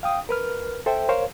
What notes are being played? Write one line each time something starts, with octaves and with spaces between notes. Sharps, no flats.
F5 G5 D#6
A#4 B4 F6
A4 C5 E5 G5
A#4 C5 C#5 F5